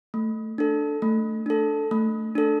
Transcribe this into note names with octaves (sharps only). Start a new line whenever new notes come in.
A3
D4 A4
A3
D4 A4
A3
D4 A4